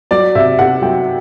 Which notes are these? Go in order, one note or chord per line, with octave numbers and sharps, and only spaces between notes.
F#3 D5
C3 E5
C3 F#5
F#3 G5